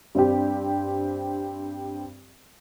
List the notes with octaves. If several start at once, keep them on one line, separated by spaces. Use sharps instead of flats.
G2 C4 G4